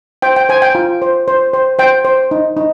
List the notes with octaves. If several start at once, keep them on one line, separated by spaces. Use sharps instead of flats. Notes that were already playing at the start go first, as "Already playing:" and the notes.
C5 G5
G5
C5 G#5
G5
F4
C5
C5
C5
C5 G5
C5
D#4
D#4